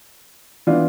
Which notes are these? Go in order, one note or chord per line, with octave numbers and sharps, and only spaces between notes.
E3 B3 D4 F4